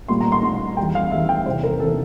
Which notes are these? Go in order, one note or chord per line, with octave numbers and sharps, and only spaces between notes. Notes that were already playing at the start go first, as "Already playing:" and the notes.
A#2 G3 A#3 C6
A#5
C6
A#2 G3 A#3 C6
E2 E3 G3 G5
F5
E2 E3 G3 E5
G5
E2 C3 E3 C5
A#4
C3 E3 A4